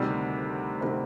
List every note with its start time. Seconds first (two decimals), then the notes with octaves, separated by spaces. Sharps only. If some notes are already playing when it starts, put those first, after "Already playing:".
Already playing: D2 C3 D#3 G3 C4
0.81 C3 D#3 G3 C4